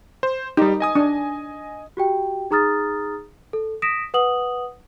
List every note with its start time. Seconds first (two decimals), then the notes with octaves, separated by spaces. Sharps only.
0.23 C5
0.57 G3 D#4 G4
0.80 D#5 G#5 D#6
0.95 D4
1.97 F#4 G4 G5
2.51 D#4 G#4 A#5 D#6 F6 A6
3.53 A4
3.82 D#6 A#6 B6 D7 E7
4.14 B4 F#5 D#6 F#7